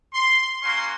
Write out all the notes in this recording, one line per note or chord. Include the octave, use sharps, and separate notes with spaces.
C6
A#3 C#4 F#4 C6